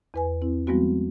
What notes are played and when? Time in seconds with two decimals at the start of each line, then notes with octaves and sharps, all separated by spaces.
0.14 E2 B4 G#5
0.42 C4 E4
0.67 F3 G3 G#3 B3 C4 F#4